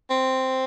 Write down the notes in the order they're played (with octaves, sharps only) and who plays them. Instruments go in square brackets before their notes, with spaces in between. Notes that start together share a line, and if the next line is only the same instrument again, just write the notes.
[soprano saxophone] C4